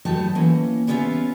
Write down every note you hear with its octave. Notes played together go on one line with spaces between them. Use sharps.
G2 F#3 A3 G4 D#5 A5
E3 A#3 C#4
G3 B3 C#4 F4 D#5 E5